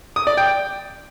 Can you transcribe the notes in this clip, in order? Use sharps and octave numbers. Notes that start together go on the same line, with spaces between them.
D#6
D5
G5